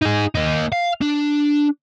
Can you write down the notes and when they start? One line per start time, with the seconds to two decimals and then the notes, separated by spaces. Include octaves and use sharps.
0.02 D#4 G#4
0.35 A#3 D#4
0.72 F5
1.01 D4